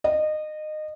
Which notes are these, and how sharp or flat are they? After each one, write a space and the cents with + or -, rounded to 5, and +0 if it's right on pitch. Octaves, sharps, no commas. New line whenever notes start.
D#5 -20